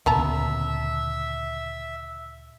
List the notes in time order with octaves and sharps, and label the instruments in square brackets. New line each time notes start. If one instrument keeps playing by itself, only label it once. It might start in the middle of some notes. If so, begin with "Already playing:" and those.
[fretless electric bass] D2 A#2 C#3 [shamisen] B3 A5 A#5 [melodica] E5